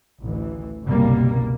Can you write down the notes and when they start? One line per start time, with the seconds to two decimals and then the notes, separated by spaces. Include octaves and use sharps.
0.21 A1 D2 E3
0.84 F#1 C2 B2 G3 A#3